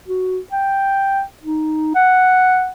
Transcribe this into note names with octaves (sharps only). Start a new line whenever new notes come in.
F#4
G5
D#4
F#5